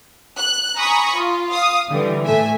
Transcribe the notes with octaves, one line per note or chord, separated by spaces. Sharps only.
F#6
G#5 A#5 B5 C#6 D#6
F4
F5 D#6
D3 E3 G3
A2 A3 E5 G#5